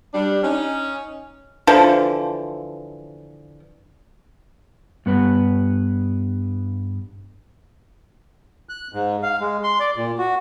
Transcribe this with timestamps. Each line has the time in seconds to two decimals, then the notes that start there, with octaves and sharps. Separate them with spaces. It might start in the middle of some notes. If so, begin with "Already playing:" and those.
0.14 G3 D4
0.43 C#4 D#4
1.67 D3 E3 F3
5.06 G2 B3 B4
8.69 F#6
8.93 G#2
9.23 F5
9.40 G#3
9.64 C6
9.80 D5
9.96 A#2
10.18 F#4